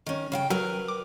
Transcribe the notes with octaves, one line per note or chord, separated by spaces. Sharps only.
D#3 C#4
C#3 F5 G5
F#3 A#4 B4
D6